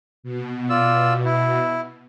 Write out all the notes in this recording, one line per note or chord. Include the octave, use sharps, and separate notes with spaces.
B2
F4 D5 E6
E4